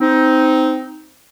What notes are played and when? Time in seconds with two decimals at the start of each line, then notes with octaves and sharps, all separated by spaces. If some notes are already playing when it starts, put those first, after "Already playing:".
0.01 C4 D#4